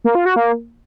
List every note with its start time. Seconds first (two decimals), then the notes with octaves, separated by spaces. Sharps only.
0.04 A#3
0.15 F4
0.26 F#4
0.36 A#3